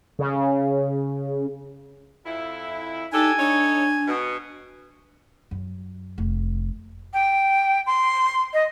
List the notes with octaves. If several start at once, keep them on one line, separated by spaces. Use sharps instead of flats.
C#3
F2 E4
D4 D#4 G4 A4 G#5
D4 D#4 A4 C#5
B2
F#2
F1
G5
C6
D#5